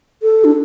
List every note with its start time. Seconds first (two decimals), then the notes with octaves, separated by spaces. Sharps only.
0.23 A4
0.44 D4